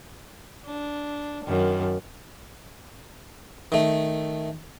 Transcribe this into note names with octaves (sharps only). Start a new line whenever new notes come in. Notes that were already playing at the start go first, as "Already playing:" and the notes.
D4
F#2 D#3
D#3 A3